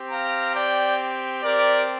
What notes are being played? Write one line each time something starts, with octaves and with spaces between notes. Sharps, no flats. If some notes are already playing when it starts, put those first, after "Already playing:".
Already playing: C4 G4
F5 A#5
D5 G5
C4 G4 A#4 D5